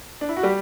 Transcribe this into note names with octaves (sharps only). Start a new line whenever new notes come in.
D4
E4
F#4
G3 G4